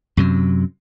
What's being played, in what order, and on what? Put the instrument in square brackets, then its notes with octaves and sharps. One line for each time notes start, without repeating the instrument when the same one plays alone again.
[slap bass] F#2 C3 F#3